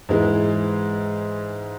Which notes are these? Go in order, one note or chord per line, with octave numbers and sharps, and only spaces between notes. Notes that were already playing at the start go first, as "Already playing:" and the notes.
G#2 E3 G#3